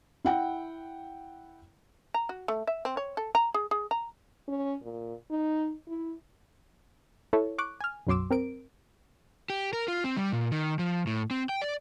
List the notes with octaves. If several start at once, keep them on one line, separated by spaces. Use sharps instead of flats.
E4 F#5 G5
A#5
F#4
A3
E5
C4
C#5
A4
A#5
G#4
G#4
A#5
C#4
A#2
D#4
E4
E4 A4 C#5
C#6 D6 F#6
G#5 F6
B1 F#2 F#3 C6 D6 E6
C4 A#4 D7
G4
A#4
F4
C4
G3
A#2
D#3
F3
A2
C4
G5
D5